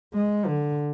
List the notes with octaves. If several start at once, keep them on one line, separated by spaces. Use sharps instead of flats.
G#3
D3